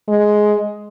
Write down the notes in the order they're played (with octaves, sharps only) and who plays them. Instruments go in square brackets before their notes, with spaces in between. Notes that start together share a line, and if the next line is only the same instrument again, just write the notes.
[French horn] G#3